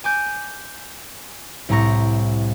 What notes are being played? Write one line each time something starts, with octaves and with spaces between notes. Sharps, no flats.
G#5 D6 G6
C2 A2 C4 A#5 C#6 A#6